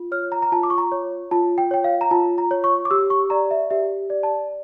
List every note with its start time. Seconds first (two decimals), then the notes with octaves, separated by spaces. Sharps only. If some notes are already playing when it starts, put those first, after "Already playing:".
Already playing: F4
0.12 C#5 F6
0.32 A#5
0.42 A#5
0.52 F4 A5
0.63 D6
0.70 C#6
0.78 A#5
0.92 C#5
1.31 F4 A5
1.58 G5
1.71 C#5 G5
1.84 F5
2.01 A#5
2.11 F4 A5
2.38 A#5
2.51 C#5
2.64 C#6
2.85 D6
2.91 G4 E6
3.10 C#6
3.30 D5 A#5
3.51 E5
3.70 G4 E5
4.10 D5
4.23 A5